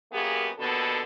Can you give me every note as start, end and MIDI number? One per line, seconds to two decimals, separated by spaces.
0.12 0.49 42
0.12 0.49 58
0.12 0.49 59
0.12 0.49 67
0.12 0.49 68
0.59 1.02 39
0.59 1.02 47
0.59 1.02 50
0.59 1.02 59
0.59 1.02 69